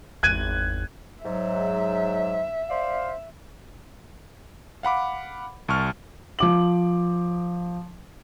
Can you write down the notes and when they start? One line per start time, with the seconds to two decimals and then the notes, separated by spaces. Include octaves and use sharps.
0.23 G#1 E2 F#6 G#6 D#7
1.24 G#2 F#3 E5
2.68 C5 D5 F5
4.83 F5 F#5 B5 D6
5.68 C2 A5 C#6 F6
6.39 F3 D6 F#7